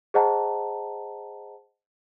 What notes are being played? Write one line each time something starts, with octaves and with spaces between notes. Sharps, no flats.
G#4 C5 D#5 F#5 A5 A#5